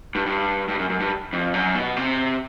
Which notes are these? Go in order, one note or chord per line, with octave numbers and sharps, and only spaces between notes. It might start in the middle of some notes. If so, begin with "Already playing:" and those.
G2
G2
G2
F#2
F#2
G2
F2
F#2
B2
C3